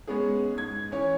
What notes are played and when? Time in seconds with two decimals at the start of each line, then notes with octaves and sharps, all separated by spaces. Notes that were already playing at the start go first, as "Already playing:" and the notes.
0.07 G#3 B3 C#4 G#4
0.54 G#2 G#6
0.92 E3 C#4 C#5